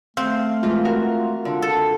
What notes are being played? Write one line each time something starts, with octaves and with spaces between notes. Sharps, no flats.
A3 C4 F5
E3 G#3 F4
F#4 A#4
D3
A4